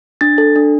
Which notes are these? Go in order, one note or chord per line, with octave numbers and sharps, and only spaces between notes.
D4 A6
A4
D4